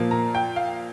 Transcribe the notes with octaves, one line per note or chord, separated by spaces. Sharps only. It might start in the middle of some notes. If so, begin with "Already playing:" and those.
Already playing: A#2 F3 A#3
A#5
G5
F5